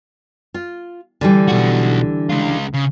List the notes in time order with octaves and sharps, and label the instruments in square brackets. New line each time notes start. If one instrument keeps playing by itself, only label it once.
[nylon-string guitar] F4
D3 E3 G3
[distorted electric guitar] B1 F#4
C#2 F4
C#3